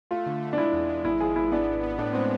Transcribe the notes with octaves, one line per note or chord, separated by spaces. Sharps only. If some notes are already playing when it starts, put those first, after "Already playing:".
A3 F4
D3
A3
D4
G#3 E4
E2
G#3
G#1 E4
F3 G#4
G#1 E4
B3 D4
B3
B3
A2 D4
G#3 C4